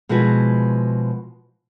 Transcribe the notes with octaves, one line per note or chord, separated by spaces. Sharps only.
B2 F3 G#3 E4 F#4 B4